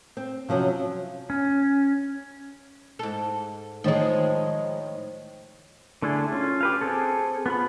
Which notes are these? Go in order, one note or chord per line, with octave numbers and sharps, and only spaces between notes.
C4
C3 F3 F#3 C#4
C#4
G#2 A4
A2 D#3 F3 G#3 C#5
D3 A3 D4 E4 G#4
C#4 F4
G4 B4 F5
C4 G#4 A4
B3 F4 B5